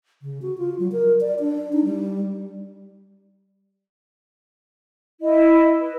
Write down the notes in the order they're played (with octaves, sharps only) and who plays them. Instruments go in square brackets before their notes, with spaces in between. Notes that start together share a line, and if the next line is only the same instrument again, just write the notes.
[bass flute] C#3
F#4
F4
F#3
A#4
D5
D4
D#4
G3
[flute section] E4 D#5
B4